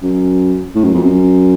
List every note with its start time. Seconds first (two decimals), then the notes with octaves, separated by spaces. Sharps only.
0.03 F#2
0.75 A2
0.84 F#2
0.94 F2
1.03 F#2